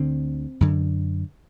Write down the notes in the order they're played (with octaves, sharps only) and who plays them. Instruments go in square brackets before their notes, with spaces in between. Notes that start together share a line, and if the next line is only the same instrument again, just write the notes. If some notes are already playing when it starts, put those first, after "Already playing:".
Already playing: [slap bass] D2 D3 C4
F#2 D3